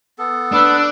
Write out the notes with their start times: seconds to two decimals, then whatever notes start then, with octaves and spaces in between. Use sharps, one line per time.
0.18 B3 A4
0.52 D4 B4 E6